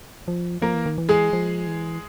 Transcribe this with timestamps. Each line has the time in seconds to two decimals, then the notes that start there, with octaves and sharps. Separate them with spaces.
0.28 F3
0.62 F3 A#3 A#4
0.74 E3
0.86 D#3
0.98 E3
1.09 G#3 G#4
1.33 F3
1.67 E3